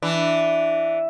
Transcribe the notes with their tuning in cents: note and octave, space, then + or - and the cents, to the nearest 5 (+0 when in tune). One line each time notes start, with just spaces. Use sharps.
E3 +0 D4 +0